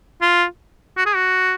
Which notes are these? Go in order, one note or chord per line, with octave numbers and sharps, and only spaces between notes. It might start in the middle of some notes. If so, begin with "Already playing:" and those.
F4
F#4
G#4
F#4